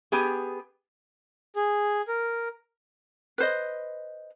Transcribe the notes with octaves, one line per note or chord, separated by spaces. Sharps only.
B3 G4 G#4
G#4
A#4
B4 C5 D#5